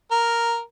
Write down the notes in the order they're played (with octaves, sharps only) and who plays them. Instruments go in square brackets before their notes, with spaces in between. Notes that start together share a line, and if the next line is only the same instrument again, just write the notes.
[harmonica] A#4